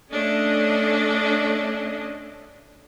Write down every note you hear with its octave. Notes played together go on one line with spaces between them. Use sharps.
A3 C#4 D4 D#5